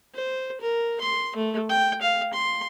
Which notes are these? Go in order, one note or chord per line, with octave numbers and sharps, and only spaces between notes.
C5
A#4
C6
A3
G5
F5
C6